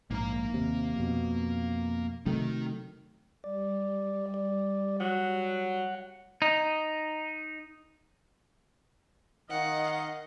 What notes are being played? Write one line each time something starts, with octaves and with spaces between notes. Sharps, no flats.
A#1 G#2 A#3 A#5
D#2 C3
F2 B2
C3 D#3 F#3 A3 D#4
G3 D5
D5
F#3 F#5
D#4
D#3 D#5 F5 F#5